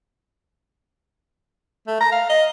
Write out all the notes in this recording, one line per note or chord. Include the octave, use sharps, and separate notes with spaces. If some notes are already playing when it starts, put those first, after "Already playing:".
A3
A#5
F5
D#5